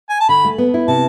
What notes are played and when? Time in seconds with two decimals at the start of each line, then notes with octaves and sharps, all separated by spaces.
0.09 G#5
0.20 A5
0.29 D3 B5
0.45 A3
0.58 B3
0.74 E4
0.88 C3 A5